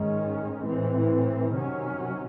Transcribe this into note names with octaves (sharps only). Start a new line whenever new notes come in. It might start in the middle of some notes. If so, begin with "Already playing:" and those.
Already playing: G#2 D#3 G#3 C#4
A2 E3 C4
C3 D#3 F#3 C#4